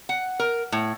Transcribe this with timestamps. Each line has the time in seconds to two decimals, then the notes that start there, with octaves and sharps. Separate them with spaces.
0.09 F#5
0.40 A#4
0.72 A2